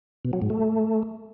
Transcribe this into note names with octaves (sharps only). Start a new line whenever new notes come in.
B2
F#3
G#2
A3